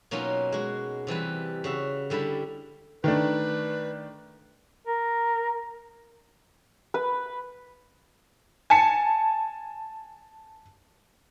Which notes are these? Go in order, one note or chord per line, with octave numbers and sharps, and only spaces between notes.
B2 F#3 A#3 C#4 D#4 F4
G#3 F#4
C3 E3 G3 B4
C#3 F#4 E5
D3 G3 E4 A5 B5
D#3 A3 D4 B4
A#4
B4
G#5 A5 C#7